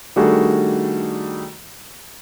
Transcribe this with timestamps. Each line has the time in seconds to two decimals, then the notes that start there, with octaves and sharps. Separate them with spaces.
0.16 D#3 G3 A3 D4 F#4 G#4